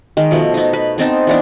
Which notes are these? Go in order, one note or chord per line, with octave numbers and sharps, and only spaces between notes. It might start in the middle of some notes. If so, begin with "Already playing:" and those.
D#3 G#3
B2 F3 A3
B3 D#4
B4
B3 C4 D#4 A5
E3 B3 D4